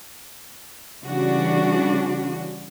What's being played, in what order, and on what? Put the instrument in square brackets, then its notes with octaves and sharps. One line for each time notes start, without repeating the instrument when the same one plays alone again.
[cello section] C#3 E3 G3 C#4 D4 F#4